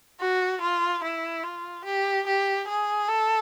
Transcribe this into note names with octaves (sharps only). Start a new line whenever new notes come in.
F#4
F4
E4
F4
G4
G4
G#4
A4